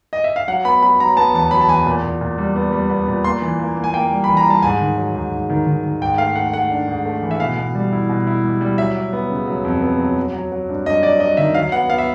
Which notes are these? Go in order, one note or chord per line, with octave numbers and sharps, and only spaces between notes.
D#5
E5
F5
F#3 F#5
B3 B5
F#3 B5
F#3 A#5
B3 A5
E2 A5
F#3 B5
A5
E2 G#5
A#2
A#2
A#2
G3
B3
G3
B3
A#2
A#3 C6
E3
A#3
A#3
G#5
A#3 G5
G3
E3 B5
A#5
G3
A5
G#2 G#5
D#3
F#3
G#2
G#2
D#3
D#3
D#3
G#2 G5
A3 F5
A3 F#5
A3 F#5
D4
G#2
A3
E3
E5
B2 F5
B2
G3
E4
B2
E4
G3
G3
F#3 E5
F#3
B3
C#3
F#3
F2
B3
F#3
F#3
F#3
F#3
G2
G2 D#5
F#3 D5
F#3 D#5
D#3 E5
F#3 F5
B3 F#5
B3 F5
E5